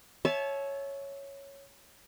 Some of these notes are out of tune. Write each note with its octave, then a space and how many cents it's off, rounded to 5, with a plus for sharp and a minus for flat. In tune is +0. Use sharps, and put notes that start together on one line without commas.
C#5 +0 E5 +0 A5 -35